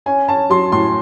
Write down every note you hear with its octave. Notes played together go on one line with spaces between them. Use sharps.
C#4 G#5
C#4 A5
F#3 C6
A2 C6